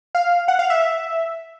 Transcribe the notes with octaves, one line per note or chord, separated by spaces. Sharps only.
F5
F#5
F5
E5